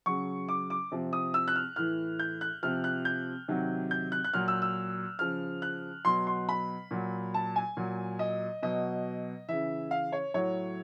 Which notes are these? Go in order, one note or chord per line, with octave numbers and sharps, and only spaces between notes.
C#3 F#3 C#6
D6
D6
C3 F3
D#6
E6
F#6
F6
A2 E3 F6
G6
F#6
C3 F3 F6
F#6
G6
C3 D#3 F#3
G6
F#6
F#6
A#2 F#3 F6
E6
E6
C#3 F3 F6
F#6
B2 F#3 C6
C6
B5
A#2 F#3
A5
G#5
A#2 F#3
D#5
B2 F#3 D#5
C#3 E3 E5
F5
C#5
A2 F#3 C#5